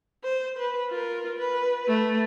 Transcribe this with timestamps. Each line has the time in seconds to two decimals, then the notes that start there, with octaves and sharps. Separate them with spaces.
0.24 C5
0.58 B4
0.90 F4 A#4
1.38 B4
1.87 A3